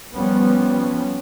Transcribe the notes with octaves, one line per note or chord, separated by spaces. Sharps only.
F3 G3 B3 C#4